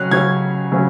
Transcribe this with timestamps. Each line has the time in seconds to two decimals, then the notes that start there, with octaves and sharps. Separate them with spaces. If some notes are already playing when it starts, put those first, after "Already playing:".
Already playing: C#3 F#3 C#4 F#6
0.11 C#3 F#3 C#4 G#6
0.72 C#3 F#3 C#4